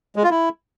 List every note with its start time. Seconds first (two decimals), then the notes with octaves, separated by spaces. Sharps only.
0.16 G#3
0.23 F4
0.31 E4